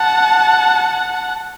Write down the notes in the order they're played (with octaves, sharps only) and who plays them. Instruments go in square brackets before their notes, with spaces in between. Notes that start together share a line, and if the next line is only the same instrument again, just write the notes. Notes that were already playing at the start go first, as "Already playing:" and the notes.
Already playing: [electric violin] F#5 [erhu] A5